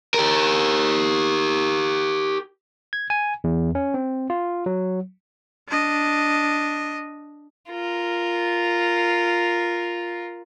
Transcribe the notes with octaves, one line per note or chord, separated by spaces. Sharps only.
G4 A#4
G#6
G#5
E2
C#4
C4
F4
F#3
D4 D#5
F4 A#4